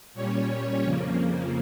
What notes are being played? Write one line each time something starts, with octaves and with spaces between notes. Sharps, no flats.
A#2 G3 C#4 C#5
F2 C#3 F3 A#3